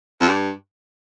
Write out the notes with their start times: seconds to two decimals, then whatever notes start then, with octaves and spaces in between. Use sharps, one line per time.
0.21 F2
0.29 G2